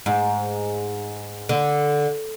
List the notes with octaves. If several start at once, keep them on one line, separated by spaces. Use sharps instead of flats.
G#2
D3